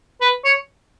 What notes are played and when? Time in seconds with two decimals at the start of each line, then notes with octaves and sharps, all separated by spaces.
0.21 B4
0.45 C#5